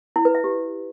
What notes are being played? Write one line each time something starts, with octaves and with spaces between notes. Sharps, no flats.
E4
B4
E5
G4